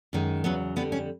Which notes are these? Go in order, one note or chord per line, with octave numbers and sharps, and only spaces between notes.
F#2 D#3 G#3
E2 C#3 F#3 B3
F2 D3 G3 B3
C#4